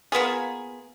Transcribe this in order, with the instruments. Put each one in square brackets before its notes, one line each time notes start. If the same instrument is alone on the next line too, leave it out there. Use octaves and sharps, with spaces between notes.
[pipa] A#3 B3 F4 G#4